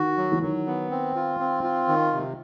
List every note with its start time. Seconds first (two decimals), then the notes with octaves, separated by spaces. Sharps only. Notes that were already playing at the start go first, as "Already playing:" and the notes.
Already playing: D#3 F#4
0.17 F#3
0.32 E3
0.42 D#3 F#3
0.67 B3
0.91 C4
1.15 F4
1.40 C4
1.64 F4
1.88 D#3
2.13 C3